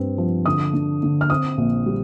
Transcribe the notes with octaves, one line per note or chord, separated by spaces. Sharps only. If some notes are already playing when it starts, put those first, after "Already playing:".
Already playing: G2 C4
F3
D3 D#6
D3
D3
F6
C4 D#6
A#1
G3